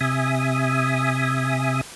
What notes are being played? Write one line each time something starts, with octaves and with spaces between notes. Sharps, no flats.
C3 E5 G#5 D#6